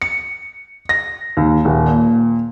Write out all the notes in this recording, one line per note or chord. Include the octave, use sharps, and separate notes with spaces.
C#7
A#6
D#2
D#1
A#2